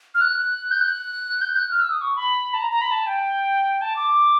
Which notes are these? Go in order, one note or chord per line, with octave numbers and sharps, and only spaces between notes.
F6
F#6
G6
F#6
G6
F#6
F6
E6
D#6
C#6
B5
A5
A#5
A#5
B5
A5
G5
A5
D6